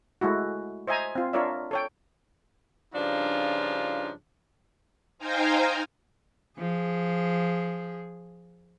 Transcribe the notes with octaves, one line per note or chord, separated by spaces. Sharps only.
G#3 A3 E4 F#4
C5 D#5 E5 G#5 A#5
C4 F4
D4 F4 A#4 C#5 D5 E5
A4 C#5 G5
G2 C#3 F3 D4 D#4 F4
D#4 C5 F5 G5 G#5 A#5
F3 G#4